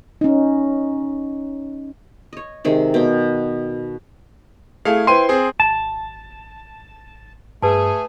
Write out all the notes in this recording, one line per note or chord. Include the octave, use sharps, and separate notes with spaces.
C#4 D#4
C#5 D#5
C3 D#3 G#3
B2 G5
A3 E4 G#4 F5
E4 B4 C5 G5 C6 D#7
C4 G#4
G#1 A5
G2 A3 G#4 B4 A5